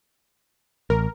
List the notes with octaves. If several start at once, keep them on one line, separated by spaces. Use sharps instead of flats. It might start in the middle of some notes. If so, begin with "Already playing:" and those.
A1 A#4